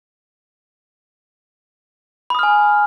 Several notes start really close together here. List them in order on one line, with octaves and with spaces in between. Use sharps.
B5 D#6 F6 G#5